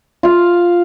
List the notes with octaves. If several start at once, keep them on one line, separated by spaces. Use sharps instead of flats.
F4 F5